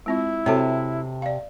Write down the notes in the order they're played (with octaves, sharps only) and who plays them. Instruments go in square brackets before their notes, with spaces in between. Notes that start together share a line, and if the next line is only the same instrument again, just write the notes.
[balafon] G#3 C4 F4 [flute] E4
[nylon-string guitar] C3 A5 [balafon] F#4 A4 C#5
[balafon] D5 F5